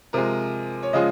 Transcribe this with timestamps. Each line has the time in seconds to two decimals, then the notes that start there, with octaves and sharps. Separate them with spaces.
0.13 C3 F3 G#3 A#4
0.83 C#5
0.93 C#3 F3 G#3 D#5